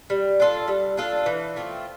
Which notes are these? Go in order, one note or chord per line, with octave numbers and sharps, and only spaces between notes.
G3
D4 F4 A4
G3
D4 F4 A4
E3
A3 C4 F4